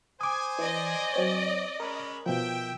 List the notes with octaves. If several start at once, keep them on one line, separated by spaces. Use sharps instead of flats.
C5 G#5 D6 D#6
E3 D5 D#5
F#3 C4 C#5
G#3 C#4 A#4 B5
B2 F3 E5 G5